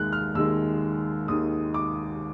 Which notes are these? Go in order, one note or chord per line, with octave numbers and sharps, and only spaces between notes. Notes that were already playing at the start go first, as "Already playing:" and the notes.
Already playing: D#2 D#3 G#3 F#6
F6
D#2 D#3 G#3 E6
D#2 D#3 G#3 D#6
D6